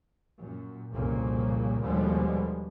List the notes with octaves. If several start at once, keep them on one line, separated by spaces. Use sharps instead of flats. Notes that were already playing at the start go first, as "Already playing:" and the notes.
F#2 A#2
C2 F2 A#2 C#3 A#3
D#2 B2 D3 F3 G3 G#3